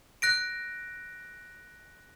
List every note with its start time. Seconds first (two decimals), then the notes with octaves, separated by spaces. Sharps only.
0.22 F#6 A#6 D7